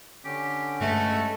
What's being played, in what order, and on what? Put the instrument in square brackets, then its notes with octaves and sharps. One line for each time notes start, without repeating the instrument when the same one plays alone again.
[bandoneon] D3 C#4 [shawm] G4
[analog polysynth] G2 G#3 [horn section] A3 [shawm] F#4